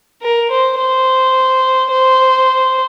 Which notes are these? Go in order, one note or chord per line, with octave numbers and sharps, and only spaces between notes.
A#4
C5
C5
C5